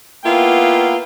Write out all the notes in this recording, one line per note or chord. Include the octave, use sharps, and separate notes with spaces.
A#3 B3 E4 F4 G5